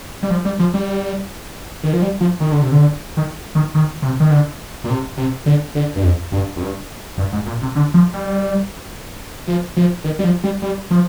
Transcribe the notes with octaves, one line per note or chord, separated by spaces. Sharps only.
G3
F3
G3
F3
G3
D#3
F3
G3
F3
D#3
D3
C3
D3
D#3
D#3
D#3
C3
D#3
D3
A#2
C3
C3
D3
D3
G2
F2
G2
F2
G2
G2
G#2
A#2
C3
D3
F3
G3
F3
F3
D#3
G3
F3
G3
G3
F3